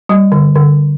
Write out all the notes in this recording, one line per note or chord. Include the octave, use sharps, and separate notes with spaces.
G3
D3
D3